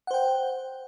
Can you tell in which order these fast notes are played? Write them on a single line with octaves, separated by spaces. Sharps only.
F#5 C5 G5